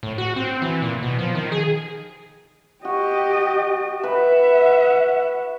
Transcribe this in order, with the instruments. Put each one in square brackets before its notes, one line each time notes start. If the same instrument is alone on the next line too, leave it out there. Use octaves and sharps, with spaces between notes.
[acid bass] A2
F#4
C4
E3
A#2
B2
F3
D#3
G#4
[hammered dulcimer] F#4 [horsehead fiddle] G4 D#5
[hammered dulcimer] B4 [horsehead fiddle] E5 F#5